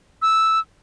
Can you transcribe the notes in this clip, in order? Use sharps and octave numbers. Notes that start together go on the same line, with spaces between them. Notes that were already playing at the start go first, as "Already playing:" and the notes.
E6